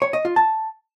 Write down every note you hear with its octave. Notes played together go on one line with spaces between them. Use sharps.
C#5
D#5
F4
A5